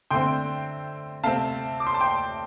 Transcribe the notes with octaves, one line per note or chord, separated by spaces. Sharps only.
D3 A3 C4 G5 C6
C3 A3 C4 F5 A5
D6
C6
A5
G5 C6